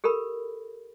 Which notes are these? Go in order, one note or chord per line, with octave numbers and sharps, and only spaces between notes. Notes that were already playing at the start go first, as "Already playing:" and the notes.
G4 A4 A#4 B5